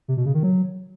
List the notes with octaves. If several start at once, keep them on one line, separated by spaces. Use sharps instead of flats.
C3
B2
C#3
D#3
F#3